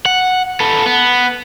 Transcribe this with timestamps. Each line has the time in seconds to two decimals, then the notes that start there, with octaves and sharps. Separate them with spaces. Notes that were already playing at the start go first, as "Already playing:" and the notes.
0.06 F#5
0.60 A4 B4
0.86 B3